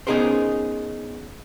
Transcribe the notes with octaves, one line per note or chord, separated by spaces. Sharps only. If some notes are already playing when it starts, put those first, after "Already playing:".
B3 C#4 D#4 G#4 A#4 C5